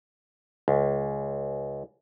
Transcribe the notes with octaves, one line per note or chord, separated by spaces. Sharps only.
C#2